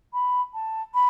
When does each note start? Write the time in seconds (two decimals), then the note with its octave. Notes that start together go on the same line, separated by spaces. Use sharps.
0.13 B5
0.54 A5
0.94 B5